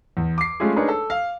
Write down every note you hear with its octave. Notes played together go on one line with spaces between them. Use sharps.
E2
D6 C7
G#3 A3 C#4 F4 G#4
D4 D#4 G#4 A#4 B4 C#5
A4
F5